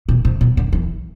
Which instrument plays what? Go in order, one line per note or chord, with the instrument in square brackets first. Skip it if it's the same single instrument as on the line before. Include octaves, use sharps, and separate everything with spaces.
[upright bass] B2
C3
B2
D3
E3